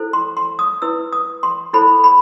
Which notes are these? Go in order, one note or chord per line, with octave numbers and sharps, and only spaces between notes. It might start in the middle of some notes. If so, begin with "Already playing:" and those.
Already playing: E4 A4 C5
C6
C6
D#6
E4 B4 E6
D#6
C6
E4 A4 C5 B5
B5